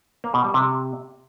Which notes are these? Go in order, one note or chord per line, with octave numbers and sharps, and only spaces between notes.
A#3
B2
G3
C3